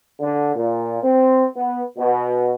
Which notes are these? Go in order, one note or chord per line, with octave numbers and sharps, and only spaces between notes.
D3
A#2
C4
B3
B2